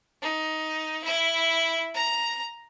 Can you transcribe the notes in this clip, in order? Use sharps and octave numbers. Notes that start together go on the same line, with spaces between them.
D#4
E4
A#5